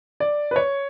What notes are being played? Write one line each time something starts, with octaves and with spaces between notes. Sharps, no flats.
D5
B4
C#5